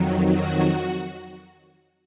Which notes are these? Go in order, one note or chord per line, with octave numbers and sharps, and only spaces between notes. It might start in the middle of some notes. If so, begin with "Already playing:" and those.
Already playing: F2 D#3 F#3
F#4